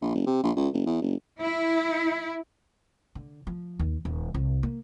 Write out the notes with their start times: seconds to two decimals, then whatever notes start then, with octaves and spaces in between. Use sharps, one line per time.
0.02 A#1
0.15 F#1
0.27 C3
0.43 A#1
0.56 C#2
0.73 F#1
0.86 E2
1.02 F#1
1.42 E4
3.15 D3
3.47 F3
3.79 D#2
4.05 D#1
4.34 C2
4.63 A#3